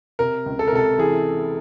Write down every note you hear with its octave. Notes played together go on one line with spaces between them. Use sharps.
C3 A#4
C#2
A4
A#4
C3 A4
E3 G#4